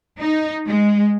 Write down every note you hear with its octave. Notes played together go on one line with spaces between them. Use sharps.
D#4
G#3